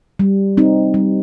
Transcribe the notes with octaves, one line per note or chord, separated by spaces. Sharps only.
G3
C4 D#4
G3